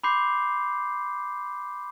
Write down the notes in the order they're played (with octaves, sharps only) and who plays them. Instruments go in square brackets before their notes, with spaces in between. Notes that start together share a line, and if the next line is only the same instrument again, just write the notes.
[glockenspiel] B5 C6 D6 G6 C7